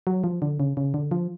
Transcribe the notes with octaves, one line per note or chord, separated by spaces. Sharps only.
F#3
F3
D3
C#3
C#3
D3
F3